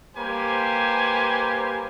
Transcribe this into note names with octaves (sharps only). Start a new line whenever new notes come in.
G3 A#3 G4 B4 C5 G#5